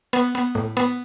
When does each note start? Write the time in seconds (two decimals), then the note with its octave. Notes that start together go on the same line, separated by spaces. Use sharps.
0.13 B3
0.35 B3
0.55 A2
0.77 B3